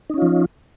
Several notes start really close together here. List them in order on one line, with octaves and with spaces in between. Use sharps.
D#4 C#4 F4 F3